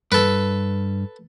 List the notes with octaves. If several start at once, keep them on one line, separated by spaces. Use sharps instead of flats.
G2 A4 B4